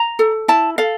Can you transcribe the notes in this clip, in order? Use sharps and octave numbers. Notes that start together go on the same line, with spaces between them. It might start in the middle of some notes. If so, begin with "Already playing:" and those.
Already playing: A#5
A4
E4 A5
A4 F5